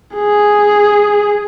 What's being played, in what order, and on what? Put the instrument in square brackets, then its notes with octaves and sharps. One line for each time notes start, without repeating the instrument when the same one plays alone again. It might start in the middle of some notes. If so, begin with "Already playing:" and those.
[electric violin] G#4